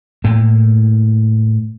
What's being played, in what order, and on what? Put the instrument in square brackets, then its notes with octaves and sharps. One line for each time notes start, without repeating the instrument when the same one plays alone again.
[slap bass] A2 A3 A#3